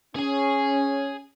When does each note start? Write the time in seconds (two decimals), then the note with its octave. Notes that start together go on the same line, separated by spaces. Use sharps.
0.15 C#4 G#4 G#5